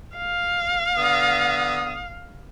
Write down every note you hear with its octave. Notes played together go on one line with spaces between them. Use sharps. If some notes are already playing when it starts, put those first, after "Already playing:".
F5
D3 B3 D#6